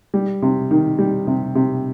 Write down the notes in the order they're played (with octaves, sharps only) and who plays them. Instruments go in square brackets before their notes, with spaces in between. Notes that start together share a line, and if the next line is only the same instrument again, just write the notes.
[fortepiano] G3
C3
D#3
G3
C3
C3